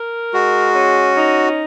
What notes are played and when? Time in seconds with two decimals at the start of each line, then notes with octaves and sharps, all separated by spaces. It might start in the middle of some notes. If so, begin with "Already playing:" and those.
Already playing: A#4
0.34 G#3 F#4
0.75 C#4
1.16 D#4